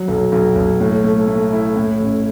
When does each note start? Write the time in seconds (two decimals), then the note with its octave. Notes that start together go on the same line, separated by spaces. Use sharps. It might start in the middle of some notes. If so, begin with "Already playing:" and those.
Already playing: F#3
0.08 B1
0.32 B1
0.56 B1
0.80 A2
1.04 A3
1.27 A3
1.52 E4
1.76 A2
1.99 A1